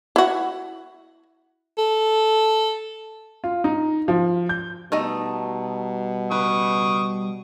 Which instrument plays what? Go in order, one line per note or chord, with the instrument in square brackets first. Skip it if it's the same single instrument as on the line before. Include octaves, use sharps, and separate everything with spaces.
[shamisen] E4 F#4
[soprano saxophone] A4
[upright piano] F4
D#4
F3
G6
[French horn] B2 [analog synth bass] G3 [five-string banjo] A3 D#4 D#5
[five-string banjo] B4 [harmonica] C#6 D#6